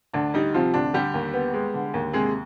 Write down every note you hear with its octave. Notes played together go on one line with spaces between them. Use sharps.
D2 D4
G3 D#4
C3 F3 F4
D2 D4
D3 G3 G4
D#2
B3
G#3
D3
D#2
C3 G#3 G#4